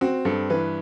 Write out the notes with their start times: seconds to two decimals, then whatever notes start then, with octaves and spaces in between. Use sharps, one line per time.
0.01 C4 F#4
0.25 G2 A4
0.50 E3 B4